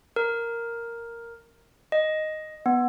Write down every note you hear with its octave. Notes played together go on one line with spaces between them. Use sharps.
A#4
D#5
B3